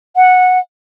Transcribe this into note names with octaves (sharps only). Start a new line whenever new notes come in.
F#5